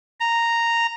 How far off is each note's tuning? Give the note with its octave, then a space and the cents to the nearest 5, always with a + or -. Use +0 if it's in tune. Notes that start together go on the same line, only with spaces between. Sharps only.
A#5 -5